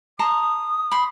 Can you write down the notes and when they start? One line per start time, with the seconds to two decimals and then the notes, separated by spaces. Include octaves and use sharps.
0.19 A5 A#5 C6 D#6
0.91 B5 C6